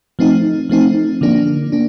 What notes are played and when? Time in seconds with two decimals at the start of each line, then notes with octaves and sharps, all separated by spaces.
0.19 F3 A3 C4 D#4
0.69 F3 A3 C4 D#4
1.21 D3 F3 A#3 D4
1.72 A#3 D4